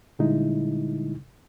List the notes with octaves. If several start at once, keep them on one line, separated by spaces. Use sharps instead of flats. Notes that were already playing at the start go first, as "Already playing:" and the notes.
A#2 D3 G3 G#3 D#4 E4